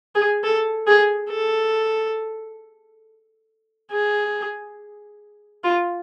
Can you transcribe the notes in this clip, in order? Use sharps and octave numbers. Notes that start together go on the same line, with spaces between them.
G#4
A4
G#4
A4
G#4
F4